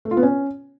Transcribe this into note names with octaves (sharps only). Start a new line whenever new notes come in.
A3
F4
B3
C#4